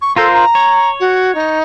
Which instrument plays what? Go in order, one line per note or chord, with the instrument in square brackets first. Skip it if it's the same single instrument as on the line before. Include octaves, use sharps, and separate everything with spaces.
[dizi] C#6
[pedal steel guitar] F4 A#4 C5 [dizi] A4
[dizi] A#5
[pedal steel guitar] C#5
[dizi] F#4
D#4